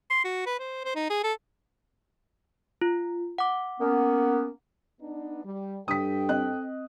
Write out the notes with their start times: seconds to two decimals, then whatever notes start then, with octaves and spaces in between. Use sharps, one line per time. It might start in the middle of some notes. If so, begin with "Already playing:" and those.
0.10 C6
0.25 F#4
0.46 B4
0.59 C5
0.84 C5
0.95 D#4
1.10 G#4
1.24 A4
2.82 F4
3.38 F#5 D6
3.81 A#3 B3 C#4
5.01 B3 D4 D#4
5.44 G3
5.88 G2 A4 G5 D#6 B6
6.29 C4 D#5 F#6